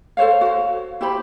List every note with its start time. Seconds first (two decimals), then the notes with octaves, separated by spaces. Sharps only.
0.17 A4 C5 C#5 F5
0.41 F#4
1.01 E4 G4 C5 B5